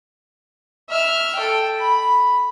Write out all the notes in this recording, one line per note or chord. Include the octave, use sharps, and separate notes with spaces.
E5 F6
A4 G5
B5